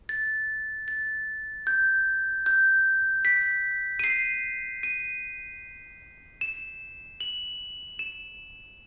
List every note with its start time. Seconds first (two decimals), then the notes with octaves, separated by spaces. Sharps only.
0.09 A6
0.88 A6
1.67 G6
2.46 G6
3.25 B6
3.99 D#7
4.04 C7
4.83 D#7
6.41 E7
7.21 F#7
7.99 E7